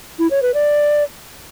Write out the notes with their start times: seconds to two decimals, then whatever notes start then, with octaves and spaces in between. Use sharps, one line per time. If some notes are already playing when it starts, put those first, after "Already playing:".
0.19 E4
0.31 C#5
0.42 B4
0.54 D5